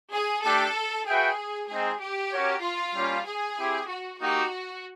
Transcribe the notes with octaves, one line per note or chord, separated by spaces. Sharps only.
G#4
A3 D4 G4 A4
F#4 G#4 B4 E5 G5
G#3 C4 D#4 G#4
G4
C#4 F#4 A#4 C#5
F4
G3 A#3 C#4
G#4
C4 E4 G4
F#4
A#3 D#4 F#4 G4